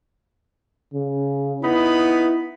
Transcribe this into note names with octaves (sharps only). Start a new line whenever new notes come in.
C#3
B3 D#4 E4 B5